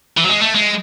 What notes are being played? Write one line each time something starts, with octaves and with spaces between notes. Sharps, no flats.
E3
F#3
G#3
A3
G#3